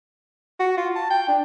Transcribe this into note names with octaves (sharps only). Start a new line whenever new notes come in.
F#4
F4
A5
G5
D4